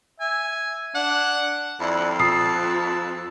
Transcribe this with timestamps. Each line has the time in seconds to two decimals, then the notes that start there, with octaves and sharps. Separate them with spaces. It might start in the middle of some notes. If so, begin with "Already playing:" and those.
0.20 E5 G#5
0.95 D4 F#5
1.80 F2 E4 D5
2.20 F4 A5 D#6 E6 C7